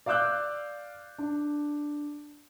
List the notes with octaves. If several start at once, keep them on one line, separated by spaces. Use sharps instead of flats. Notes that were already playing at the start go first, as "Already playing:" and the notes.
D5 F5 D6 E6 F#6 G6
D4